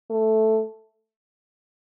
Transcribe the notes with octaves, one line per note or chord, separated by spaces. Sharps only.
A3